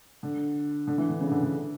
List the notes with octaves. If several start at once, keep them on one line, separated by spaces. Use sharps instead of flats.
D3
D3
E3
D3
C#3
D3
D3